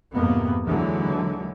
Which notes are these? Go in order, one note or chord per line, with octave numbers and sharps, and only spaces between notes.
F2 G#2 C3 A#3 B3
D#2 D3 E3 F#3 G#3